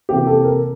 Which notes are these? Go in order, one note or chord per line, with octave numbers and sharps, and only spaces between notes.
C3 E3 A#3 G4
A4
A#4